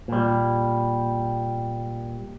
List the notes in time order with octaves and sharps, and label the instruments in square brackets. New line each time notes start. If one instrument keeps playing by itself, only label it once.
[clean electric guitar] A#2 G3